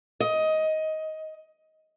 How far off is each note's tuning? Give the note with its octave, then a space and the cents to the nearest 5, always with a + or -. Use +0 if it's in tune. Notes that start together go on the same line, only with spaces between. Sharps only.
D#5 +15